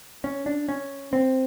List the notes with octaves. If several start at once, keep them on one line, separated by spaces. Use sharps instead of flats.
C#4
D4
C#4
C4